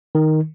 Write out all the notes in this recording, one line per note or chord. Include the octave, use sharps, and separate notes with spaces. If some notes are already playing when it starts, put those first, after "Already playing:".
D#3